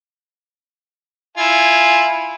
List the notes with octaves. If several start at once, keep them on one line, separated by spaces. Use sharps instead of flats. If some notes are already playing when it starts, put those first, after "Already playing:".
E4 F4 G#5